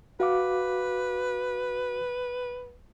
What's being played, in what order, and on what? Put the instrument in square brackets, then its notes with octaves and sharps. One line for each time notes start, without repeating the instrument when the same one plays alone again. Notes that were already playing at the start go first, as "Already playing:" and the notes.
[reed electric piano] F#4 F5 D6 [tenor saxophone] B4